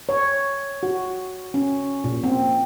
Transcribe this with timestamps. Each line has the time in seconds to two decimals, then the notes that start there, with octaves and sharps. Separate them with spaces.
0.09 C#5
0.83 F#4
1.54 C#4
2.04 A#2
2.24 C4